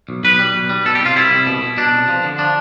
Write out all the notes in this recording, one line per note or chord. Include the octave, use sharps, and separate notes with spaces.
B1
B1 B4
G3
B1
G3
B2 A4
G4
C2
F4
G3 E4
C2
B2
B2
B2 D4
C2
F3
D3
F3 D4